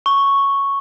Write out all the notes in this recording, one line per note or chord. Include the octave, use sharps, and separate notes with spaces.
C#6